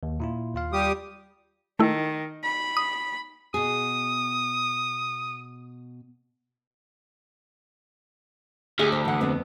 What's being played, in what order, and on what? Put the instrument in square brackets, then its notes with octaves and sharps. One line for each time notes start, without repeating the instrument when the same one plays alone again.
[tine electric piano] D#2
A#2 E4 F4
D#2 F4 F5
[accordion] G3 G4 D#6
[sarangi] D#3 [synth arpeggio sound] A3 E4
[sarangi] B5
[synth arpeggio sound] D#6
[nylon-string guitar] B2 G#4 [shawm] D#6
[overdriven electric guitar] D2 [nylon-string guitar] G4 G#4 D#5
[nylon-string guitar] C5
E3 F#5
F2 B3 C4